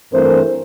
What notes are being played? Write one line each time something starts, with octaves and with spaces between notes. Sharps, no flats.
G2 E3 A3 C4 A#4 C5